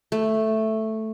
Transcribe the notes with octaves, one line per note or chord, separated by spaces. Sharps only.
A3